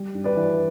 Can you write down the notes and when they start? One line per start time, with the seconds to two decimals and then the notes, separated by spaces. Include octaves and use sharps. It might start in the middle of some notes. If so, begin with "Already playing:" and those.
Already playing: G3
0.15 G2
0.24 B4 D5
0.35 E3